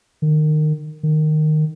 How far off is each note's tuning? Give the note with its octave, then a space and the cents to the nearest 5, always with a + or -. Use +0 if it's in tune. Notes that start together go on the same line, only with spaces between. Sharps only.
D#3 -25
D#3 -15